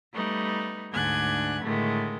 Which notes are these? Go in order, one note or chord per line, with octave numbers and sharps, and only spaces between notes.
G3 A3 B3 D#4
D2 G#2 D4 G#5 F#6 G#6
A2 D3 D#3 G#3 A3